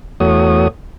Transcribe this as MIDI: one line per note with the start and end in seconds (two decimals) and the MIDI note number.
0.20 0.68 40
0.20 0.68 57
0.20 0.68 66
0.20 0.68 73
0.20 0.68 87